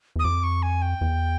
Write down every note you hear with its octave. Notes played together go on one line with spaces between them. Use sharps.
E2
D#6
F2 D6
C#6
G#5
G5
E2